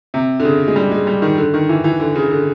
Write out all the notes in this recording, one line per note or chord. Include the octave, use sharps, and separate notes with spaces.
C3
D3
C#3
G#3
G3
G#3
G3
D#3
D3
D#3
E3
E3
D3
C#3
D3